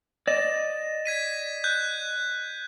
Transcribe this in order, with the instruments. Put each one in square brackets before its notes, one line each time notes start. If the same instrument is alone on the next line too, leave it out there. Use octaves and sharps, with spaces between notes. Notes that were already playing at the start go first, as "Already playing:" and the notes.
[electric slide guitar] D5 D#5 [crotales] E7
[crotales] G#6 B6 D#7
F#6 G6